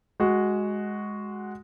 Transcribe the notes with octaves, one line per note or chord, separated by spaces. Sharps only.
G#3 F#4